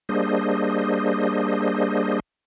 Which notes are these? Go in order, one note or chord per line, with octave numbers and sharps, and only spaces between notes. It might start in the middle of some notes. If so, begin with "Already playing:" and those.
G3 A#3 D4 G#4 C5 D#5